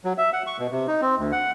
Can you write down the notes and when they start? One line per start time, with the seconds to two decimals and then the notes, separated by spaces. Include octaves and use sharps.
0.05 F#3
0.18 E5
0.33 F#5
0.47 C#6
0.59 B2
0.71 C3
0.88 D#4
1.02 C4
1.18 D2
1.32 F#5